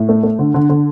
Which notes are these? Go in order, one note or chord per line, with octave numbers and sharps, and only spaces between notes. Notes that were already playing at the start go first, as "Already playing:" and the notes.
Already playing: A2
A3
A3
D3
D3
D3